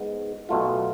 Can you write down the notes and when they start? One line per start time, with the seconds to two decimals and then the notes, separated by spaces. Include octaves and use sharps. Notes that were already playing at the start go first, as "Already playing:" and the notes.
Already playing: G#2 G#3 B3
0.49 B1 B2 A3 F4